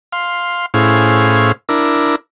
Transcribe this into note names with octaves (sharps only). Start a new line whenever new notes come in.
F5 C6
A2 C#4 E4 G#4 C5 F5
D4 E4 A#4